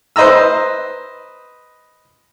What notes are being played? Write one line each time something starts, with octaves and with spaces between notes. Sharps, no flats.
B4 C5 D#5 A#5 E6